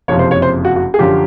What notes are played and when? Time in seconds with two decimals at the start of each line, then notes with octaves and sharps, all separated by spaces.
0.08 F#1 F2 C3 F3 C#5
0.19 C5
0.31 C#5
0.42 C5
0.65 F#4
0.76 F#4
0.94 G#4
0.99 F#2 D3 F3 G4